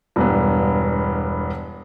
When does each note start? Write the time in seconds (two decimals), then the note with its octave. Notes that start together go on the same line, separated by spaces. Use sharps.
0.16 E1 G2 B3